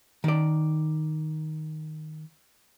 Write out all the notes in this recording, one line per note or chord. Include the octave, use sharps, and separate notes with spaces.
D#3 D5